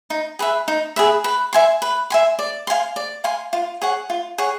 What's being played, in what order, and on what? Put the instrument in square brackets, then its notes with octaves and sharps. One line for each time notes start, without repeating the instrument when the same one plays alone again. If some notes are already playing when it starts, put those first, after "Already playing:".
[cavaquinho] D#4
G#4 B4 E5
D#4
G#4 B4 E5
B4
E5 G#5 C6
B4
E5 G#5 C6
D5
F5 G#5 C6
D5
F5 G#5 C6
F4
G#4 C#5 F#5
F4
G#4 C#5 F#5